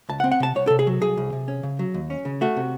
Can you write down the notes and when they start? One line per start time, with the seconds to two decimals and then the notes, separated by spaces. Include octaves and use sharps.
0.09 C#2 A5
0.20 F#5
0.24 C4
0.32 F#5
0.40 C3 A5
0.55 C2 C#5
0.67 C3 A4
0.79 G#4
0.87 F#3
1.01 C2 G#4
1.17 C2
1.33 C3
1.48 C#4
1.63 C#3
1.79 F#3
1.94 D#2
2.10 C#4
2.25 C#3
2.41 A3 F#4
2.57 C3